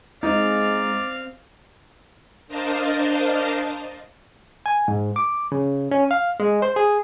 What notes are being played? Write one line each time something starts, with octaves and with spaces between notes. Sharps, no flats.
G#3 C4 D#4 D5 F5
D4 A#4 C5 D#5 F5 A5
G#5
G#2
D6
C#3
C#4
F5
G#3
C5
G#4